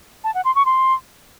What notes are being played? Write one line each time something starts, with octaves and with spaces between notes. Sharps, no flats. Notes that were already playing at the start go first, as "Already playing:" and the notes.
A5
F#5
C6
C#6
C6